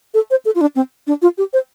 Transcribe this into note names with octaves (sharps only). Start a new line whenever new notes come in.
A4
C5
A4
F4
D4
C4
D4
F4
G4
C5